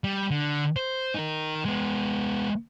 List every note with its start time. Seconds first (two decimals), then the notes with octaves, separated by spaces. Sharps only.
0.04 G3
0.31 D3
0.76 C5
1.14 D#4 A#4
1.65 G#3 B3